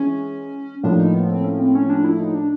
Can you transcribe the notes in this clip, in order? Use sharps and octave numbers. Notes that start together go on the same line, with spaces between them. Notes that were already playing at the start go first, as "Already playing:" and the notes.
Already playing: E3 G#3 C#4
A2 F3 A#3 D4
D#4
B3
C4
C#4
C4
C#4
D4
E4
D#4
D4